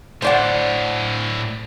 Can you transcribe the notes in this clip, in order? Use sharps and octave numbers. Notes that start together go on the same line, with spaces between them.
A2 D4 C5 D5 F#5